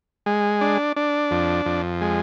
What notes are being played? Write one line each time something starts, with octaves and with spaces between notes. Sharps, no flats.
G#3
D4
D4
F2
F2
G#3